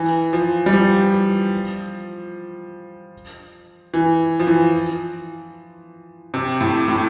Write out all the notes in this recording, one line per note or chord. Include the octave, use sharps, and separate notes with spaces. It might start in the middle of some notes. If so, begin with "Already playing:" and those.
Already playing: E3
F3
G3
F3
E3
F3
E3
C3
A2
A2